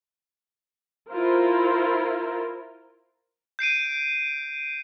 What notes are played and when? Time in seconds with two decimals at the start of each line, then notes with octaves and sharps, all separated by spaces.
1.10 E4 F4 A#4 C5
3.59 G6 C7 D7 D#7